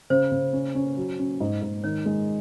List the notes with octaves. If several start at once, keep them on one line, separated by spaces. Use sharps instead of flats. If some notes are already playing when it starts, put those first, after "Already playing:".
C#3 C5
C#3
C#4
C#4
F#3
C#4
G#2
G#2
D#3 C#5
G#3